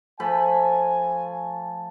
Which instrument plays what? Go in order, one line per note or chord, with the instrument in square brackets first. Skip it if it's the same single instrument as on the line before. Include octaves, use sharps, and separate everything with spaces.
[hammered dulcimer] F3 A3 B5 [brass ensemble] G#5